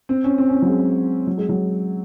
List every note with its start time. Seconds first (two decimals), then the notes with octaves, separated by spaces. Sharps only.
0.09 C4
0.24 C#4
0.38 C4
0.49 C#4
0.53 C4
0.62 F#3
0.68 G#3
1.27 F#3
1.38 G#3
1.49 F#3